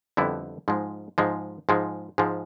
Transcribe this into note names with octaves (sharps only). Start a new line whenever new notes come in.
F2 D3 G3 B3 E4
G#2 F3 G#3
G#2 F3 G#3
G#2 F3 G#3
G#2 F3 G#3